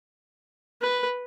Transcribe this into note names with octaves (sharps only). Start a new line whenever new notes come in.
B4